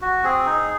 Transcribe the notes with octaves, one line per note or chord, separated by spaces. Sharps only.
F#4
C4 G#4
D#4